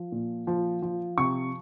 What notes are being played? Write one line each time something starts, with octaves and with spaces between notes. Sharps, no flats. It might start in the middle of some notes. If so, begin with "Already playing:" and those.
Already playing: F3
A#2
F3
F3
C3 C#6